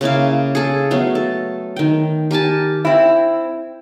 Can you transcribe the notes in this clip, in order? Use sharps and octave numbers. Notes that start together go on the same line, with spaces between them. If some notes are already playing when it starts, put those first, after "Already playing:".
C#3 A#3 E4 F5
G#4 A4
F#3 A3 B3 F5
A4
D#3 G5
G4 A#4 G#5 A5
C4 E4